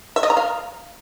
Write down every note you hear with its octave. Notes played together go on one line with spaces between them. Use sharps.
E5
D#5
A#5
F5